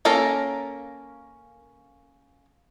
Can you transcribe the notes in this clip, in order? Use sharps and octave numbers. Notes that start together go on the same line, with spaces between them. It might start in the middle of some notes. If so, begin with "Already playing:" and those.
A#3 C#4 A4 A#4